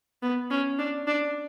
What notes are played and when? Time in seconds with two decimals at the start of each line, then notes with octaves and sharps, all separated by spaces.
0.22 B3
0.50 C#4
0.79 D4
1.07 D4